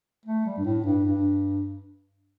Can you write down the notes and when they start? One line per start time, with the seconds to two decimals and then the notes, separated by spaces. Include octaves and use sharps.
0.25 A3
0.46 G3
0.57 G2
0.64 A2
0.84 G2
1.05 G2